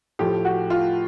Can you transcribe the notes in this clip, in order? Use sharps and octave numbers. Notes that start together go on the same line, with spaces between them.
A2 F3 A3 G4
F#4
F4